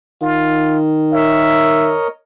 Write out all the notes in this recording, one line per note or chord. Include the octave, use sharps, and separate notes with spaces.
D#3 F4
A#4 C#5 D#5 E5